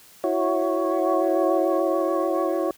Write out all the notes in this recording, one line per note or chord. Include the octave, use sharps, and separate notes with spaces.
E4 F#4 C#5